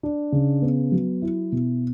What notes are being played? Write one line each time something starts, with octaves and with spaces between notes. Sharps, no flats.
D4
C#3
B3
F#3
E4
B2